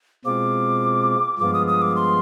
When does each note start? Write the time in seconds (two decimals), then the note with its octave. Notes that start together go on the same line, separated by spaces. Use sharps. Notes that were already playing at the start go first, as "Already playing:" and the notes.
0.25 B2 G#3 C4 F4 D6
1.39 G2 F3 G#3 B3 F4 D6
1.53 D#6
1.67 D#6
1.82 D6
1.96 C6